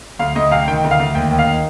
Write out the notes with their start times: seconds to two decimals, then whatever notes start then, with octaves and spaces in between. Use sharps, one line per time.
0.19 D2 F5
0.35 D2 D#5
0.51 C3 F5
0.68 D#3 G5
0.84 D2
0.91 F5
1.00 D2
1.15 D#2 G5
1.31 D#2
1.39 F5
1.47 D#3